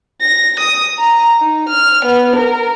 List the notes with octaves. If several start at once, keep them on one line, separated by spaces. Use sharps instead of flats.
A#6
D#6
A#5
D#4
F6
B3
A#4